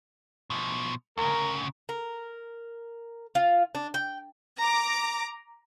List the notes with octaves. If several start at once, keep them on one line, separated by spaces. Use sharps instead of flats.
B2 F3
D2 C#3 A#4
A#4
F4
D4
G5
A#5 D6